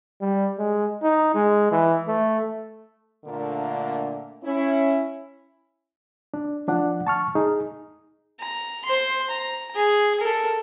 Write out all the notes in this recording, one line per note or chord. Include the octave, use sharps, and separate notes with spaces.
G3
G#3
D#4
G#3
E3
A3
A#2 D3 A3 A#3 D4
C#4 E4
D4
F3 D4 F#5
A5 C#6 F6
D#4 G#4
A#5
C5 C6
A#5
G#4
A4 A#4